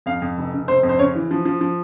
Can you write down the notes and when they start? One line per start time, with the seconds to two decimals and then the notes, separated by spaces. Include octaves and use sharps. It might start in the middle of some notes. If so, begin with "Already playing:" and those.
0.06 F2 F5
0.22 F2
0.38 F1
0.53 C#3
0.68 F1 C5
0.83 F2
0.89 C5
0.99 C#3 C#5
1.15 E3
1.31 F3
1.45 F3
1.61 F3